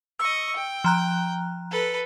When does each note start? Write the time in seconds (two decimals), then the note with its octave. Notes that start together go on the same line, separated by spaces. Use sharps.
0.19 D#5 C#6 E6
0.56 G5
0.84 F3 A#5 F#6
1.71 A4 B4